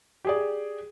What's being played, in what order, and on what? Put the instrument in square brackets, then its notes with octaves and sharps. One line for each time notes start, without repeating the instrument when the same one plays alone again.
[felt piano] G4 G#4 D5